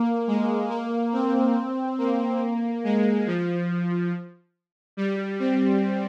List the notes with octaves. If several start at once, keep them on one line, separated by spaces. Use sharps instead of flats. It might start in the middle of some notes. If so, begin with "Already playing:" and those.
Already playing: A#3
G#3
A#3
C4
A#3
G#3
F3
G3
C4